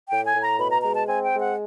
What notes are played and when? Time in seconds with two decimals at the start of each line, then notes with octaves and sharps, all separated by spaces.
0.09 A2 G5
0.26 G#5
0.34 A2
0.42 A#5
0.58 B2 B5
0.71 A#5
0.83 G#3 A#5
0.95 A5
1.07 C4 G#5
1.24 G5
1.33 G#3
1.40 F#5